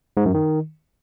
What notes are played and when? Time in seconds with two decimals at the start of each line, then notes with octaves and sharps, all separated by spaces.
0.17 G#2
0.26 F#2
0.34 D#3